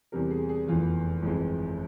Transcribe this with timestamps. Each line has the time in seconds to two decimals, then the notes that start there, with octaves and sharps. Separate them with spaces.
0.12 E2 C3 G3 A#4
0.30 G#4
0.49 G#4
0.67 F1 E2 E3 F4
1.23 G1 F2 E3 G#3